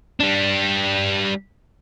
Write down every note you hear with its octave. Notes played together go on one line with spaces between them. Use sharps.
G3 D4